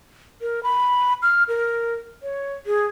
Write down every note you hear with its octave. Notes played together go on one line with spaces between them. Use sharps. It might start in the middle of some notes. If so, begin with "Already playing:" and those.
A#4
B5
F6
A#4
C#5
G#4